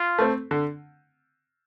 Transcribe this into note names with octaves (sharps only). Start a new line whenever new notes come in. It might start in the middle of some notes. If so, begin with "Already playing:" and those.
Already playing: F4
A3 C4
D3